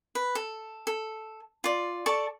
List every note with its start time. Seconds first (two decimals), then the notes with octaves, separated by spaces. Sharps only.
0.15 B4
0.35 A4
0.87 A4
1.64 F4 D5
2.06 A4 D5 A5 C#6